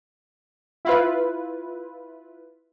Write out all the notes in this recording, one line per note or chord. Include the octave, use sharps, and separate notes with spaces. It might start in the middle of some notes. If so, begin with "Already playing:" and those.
E4 F4 B4